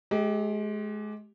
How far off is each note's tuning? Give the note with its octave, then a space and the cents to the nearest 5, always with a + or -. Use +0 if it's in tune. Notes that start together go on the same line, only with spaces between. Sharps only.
G#3 +30 G4 +0